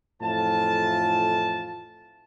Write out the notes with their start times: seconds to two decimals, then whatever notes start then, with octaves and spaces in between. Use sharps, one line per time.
0.21 F2 A2 E3 F4 A5